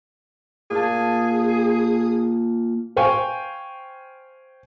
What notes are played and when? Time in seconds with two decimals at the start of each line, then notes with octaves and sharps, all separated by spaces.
0.71 A#2 G#4 A5
2.96 C5 F5 G5 G#5 C#6